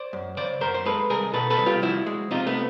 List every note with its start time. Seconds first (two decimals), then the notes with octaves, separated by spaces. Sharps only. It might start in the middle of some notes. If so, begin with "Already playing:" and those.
Already playing: C5 D5
0.13 F#2
0.37 C#3 C5 D5
0.61 F#2 A#4 C5
0.74 C5
0.85 G#3 A4 B4
1.09 C2 G#4 A#4
1.33 B2 A4 B4
1.50 A4 B4
1.58 C2
1.66 F4 G4
1.82 F3 E4 F#4
2.06 G#3
2.31 C3 D#4 F4
2.47 A3 B3